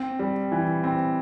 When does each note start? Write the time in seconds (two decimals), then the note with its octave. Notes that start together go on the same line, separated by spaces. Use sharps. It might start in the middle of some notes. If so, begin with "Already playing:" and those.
Already playing: C4
0.19 G3
0.52 E3
0.84 C4